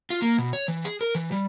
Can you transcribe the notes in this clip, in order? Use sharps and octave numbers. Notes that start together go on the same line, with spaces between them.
F4
A#3
B2
C#5
E3
G#4
A#4
E3
G3